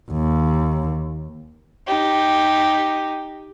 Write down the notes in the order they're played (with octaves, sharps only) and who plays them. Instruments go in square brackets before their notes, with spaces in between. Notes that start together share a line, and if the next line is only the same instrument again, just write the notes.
[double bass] D#2
[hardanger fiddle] D#4 G4